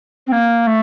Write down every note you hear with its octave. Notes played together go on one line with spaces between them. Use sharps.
C4
A#3
A3